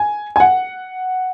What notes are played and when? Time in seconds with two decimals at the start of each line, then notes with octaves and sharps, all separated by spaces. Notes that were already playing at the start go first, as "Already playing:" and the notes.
Already playing: G#5
0.36 G#5
0.40 F#5